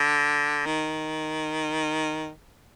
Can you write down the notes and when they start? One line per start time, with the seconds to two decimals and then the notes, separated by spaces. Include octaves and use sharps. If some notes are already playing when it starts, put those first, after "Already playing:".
Already playing: D3
0.66 D#3